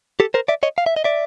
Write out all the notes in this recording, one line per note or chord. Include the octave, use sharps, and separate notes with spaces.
G4 A4
A#4 C5
D5 E5
C#5 D#5
F5
E5
D#5
D5 E5